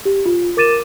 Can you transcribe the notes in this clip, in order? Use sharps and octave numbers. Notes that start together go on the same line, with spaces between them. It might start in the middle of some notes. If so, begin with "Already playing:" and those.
G4
F4
A#4 D6 A6 D#7 E7